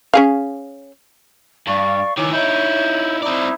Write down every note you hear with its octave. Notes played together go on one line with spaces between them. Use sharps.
C#4 G#4 F5
G2 D5 F5 C#6
D#3 E3 C#5 G#5 D6
D#4 E4 C#5 G6
C4 D#4 E4 D5